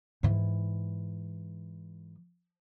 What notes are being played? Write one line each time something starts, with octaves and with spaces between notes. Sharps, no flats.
G#2 E3